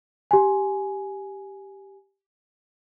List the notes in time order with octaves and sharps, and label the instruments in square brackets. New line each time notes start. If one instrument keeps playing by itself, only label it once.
[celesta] G4 G#5